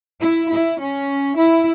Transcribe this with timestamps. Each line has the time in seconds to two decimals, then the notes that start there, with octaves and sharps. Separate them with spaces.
0.22 E4
0.51 E4
0.80 C#4
1.37 E4